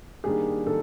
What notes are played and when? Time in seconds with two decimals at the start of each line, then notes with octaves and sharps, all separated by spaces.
0.24 D#3 G3 A#3 D4 G4 G#4
0.67 D#3 A4